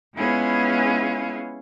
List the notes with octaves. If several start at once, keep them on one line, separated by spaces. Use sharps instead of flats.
G#3 B3 C#4 E4 F4 G#4